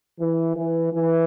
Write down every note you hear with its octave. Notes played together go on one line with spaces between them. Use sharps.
E3
E3
E3